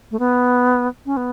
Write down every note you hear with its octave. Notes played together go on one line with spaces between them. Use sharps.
A3
B3
C#4
B3